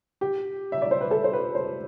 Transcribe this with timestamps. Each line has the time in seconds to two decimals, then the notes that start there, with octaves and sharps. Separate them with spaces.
0.21 G4
0.72 E5
0.82 D5
0.91 C5
1.01 B4
1.11 A4
1.24 C5
1.33 B4
1.55 C5